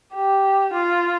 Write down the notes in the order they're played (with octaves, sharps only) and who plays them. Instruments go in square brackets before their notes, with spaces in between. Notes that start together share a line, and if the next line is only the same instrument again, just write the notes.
[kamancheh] G4
F4